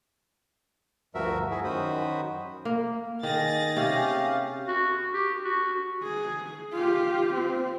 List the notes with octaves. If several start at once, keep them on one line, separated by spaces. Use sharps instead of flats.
D2 G2 F3 F#4 A#4 E5
E4 F#4 G#4
F#2 D#3 F#4 C5 B5 D#6
A#3
D#3 G#4 A6 A#6
C3 C#4 G4 F5
F#4
G4
F#4
G#4
F4 G4
C4